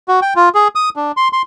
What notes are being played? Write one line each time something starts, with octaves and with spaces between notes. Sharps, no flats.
F#4
G5
F4
G#4
D#6
D4
C6
C6